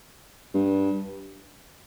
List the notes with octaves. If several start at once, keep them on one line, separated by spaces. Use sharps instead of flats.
G2